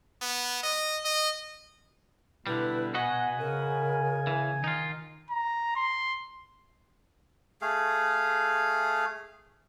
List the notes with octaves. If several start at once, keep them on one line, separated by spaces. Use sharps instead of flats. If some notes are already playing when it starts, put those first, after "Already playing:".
B3
D#5
D#5
B2 D3 G3 E4 B4
F#4 B4 D#5 F#5 G#5
C#3 A#4
E3
D#3 D#4 F4
A#5
C6
A3 G#4 F5